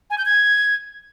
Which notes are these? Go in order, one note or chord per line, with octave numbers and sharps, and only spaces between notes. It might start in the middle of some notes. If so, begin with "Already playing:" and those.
G#5
G6
G#6